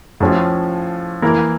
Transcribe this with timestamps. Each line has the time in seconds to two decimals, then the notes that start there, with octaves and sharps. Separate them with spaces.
0.20 A2 F3 C#4 F4
1.22 E3 A#3 E4 A#4